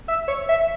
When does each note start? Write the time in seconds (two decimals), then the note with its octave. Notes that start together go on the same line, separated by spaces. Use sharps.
0.08 E5
0.28 C#5
0.49 E5